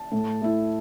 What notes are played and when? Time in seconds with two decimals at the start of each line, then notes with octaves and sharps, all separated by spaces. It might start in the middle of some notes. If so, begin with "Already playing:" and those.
Already playing: A5
0.12 A2
0.42 A3 E4